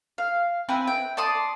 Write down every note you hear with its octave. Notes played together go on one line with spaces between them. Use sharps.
F5
C4 E4 B4 G#5
G5
D5 A5 C6 D#6